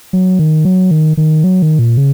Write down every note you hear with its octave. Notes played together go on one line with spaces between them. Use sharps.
F#3
D#3
F#3
D#3
D#3
F#3
D#3
A#2
C#3